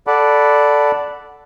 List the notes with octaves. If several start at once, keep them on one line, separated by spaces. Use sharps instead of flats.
A4 D5 F#5 A5 B5 D6